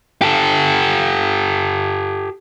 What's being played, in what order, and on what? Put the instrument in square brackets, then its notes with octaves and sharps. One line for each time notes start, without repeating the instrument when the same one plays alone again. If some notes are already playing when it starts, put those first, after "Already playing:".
[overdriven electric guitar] G4 A4